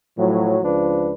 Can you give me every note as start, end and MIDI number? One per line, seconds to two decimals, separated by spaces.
0.18 0.57 45
0.18 0.57 53
0.18 0.57 54
0.62 1.13 37
0.62 1.13 53
0.62 1.13 62
0.62 1.13 71